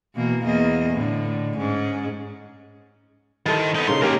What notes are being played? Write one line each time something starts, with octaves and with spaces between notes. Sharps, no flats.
B2 E3 A#3
E2 A#3 D#5
A2 D3
G#2 C#4
D#3 E4 A4 C5
B3 D#4
C#3 A#3 D#4 C6
C#3 A#3 G4 A#4